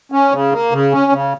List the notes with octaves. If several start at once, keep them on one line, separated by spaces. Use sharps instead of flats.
C#4
C#3
A#3
C#3
C#4
C#3